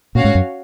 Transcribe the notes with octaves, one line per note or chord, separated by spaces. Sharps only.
A#2 C#4 F#4 C#5 F5
G#2
F#2